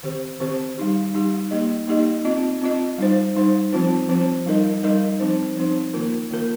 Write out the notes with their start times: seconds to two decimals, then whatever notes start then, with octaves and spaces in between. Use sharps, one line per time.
0.03 D#3 C4 G4 C5
0.40 D#3 C4 G4 C5
0.77 G3 D#4 G4
1.14 G3 D#4 G4
1.51 A#3 D#4 G4 D#5
1.87 A#3 D#4 G4 D#5
2.25 C4 F4 D#5
2.62 C4 F4 D#5
2.98 G3 D#4 C5
3.35 G3 D#4 C5
3.72 F3 C4 F4 C5
4.09 F3 C4 F4 C5
4.46 G3 D#4 A#4 D#5
4.83 G3 D#4 A#4 D#5
5.20 F3 C4 D#4 C5
5.57 F3 C4 D#4 C5
5.94 D#3 A#3 F4 A#4
6.31 D#3 A#3 F4 A#4